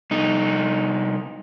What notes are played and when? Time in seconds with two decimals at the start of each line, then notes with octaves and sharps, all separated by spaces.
0.11 C2 D#4